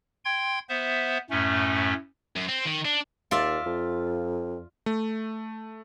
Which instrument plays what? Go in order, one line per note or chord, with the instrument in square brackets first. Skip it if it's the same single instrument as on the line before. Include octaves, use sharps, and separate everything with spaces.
[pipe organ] G5 C6 G#6
B3 C5 E5
F#2 A2 A3 C#4
[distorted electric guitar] F#2
C4
D#3
D4
[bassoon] D#2 [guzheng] F4 D5 E5
[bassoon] F2
[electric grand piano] A3